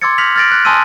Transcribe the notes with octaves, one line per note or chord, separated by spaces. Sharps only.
C6 D6 E6 G#6 A6 C#7
F6 G6 A#6 B6 F7 F#7
F6 G6 A6 A#6 D7 F#7
F#6
G#5 A5 C6 D#6 E6 D#7